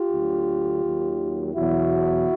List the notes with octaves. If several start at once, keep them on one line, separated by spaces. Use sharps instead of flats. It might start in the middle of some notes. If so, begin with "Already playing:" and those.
Already playing: F4 G4
D2 D3 F#3
D#2 D#3 F#3
E2 B2 F#3 E4 F#4